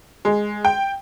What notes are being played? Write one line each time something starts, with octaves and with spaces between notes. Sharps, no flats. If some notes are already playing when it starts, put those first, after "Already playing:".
G#3
G5